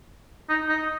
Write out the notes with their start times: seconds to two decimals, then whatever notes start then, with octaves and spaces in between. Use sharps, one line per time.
0.49 D#4
0.69 D#4